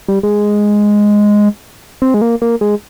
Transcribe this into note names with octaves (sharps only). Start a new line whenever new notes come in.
G3
G#3
C4
G#3
A#3
A#3
G#3